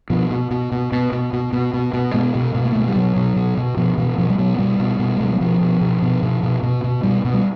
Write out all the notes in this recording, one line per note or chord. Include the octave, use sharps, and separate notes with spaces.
B2 F3
B2
B2
B2
B2
B2
B2
B2
B2
B2
B2 G#3
B2
B2
A#3
A3
B2 G#3
G3
B2 F#3
B2
B2
B2
B2 F3
B2 E3
B2 F3
G3
B2 F#3
B2 G3
B2
B2
G#3
B2 G3
F#3
B2 F3
B2
B2
B2
B2
B2
B2
B2
B2 G3
B2
G3